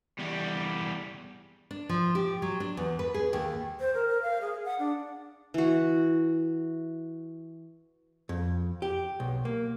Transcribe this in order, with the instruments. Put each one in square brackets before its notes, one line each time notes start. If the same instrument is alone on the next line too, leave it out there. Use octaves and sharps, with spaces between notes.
[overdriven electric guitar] E2 G3
[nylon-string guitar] D4
F3
G4
F#3
D4
E2
B4
G#4
D#2
[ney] C5
A#4
A#4
F5
G#4
F#5
D4
[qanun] E3 F#4
[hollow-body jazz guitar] F2
G4
B1
A#3